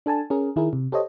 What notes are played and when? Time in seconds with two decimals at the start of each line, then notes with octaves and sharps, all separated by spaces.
0.06 D4 A4 G#5 A5
0.30 C#4 G#4 A#4
0.56 D#3 E4 G#4 A#4
0.73 C3
0.92 G4 A4 C5 C#5 D#5